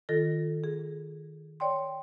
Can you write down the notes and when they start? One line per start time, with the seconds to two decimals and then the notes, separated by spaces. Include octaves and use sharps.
0.09 D#3 F4 A4 A#6
0.64 G#4
1.60 C#5 D5 G5 C6